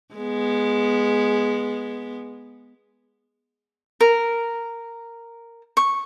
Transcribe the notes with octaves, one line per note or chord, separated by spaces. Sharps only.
G#3 B3
A#4
C#6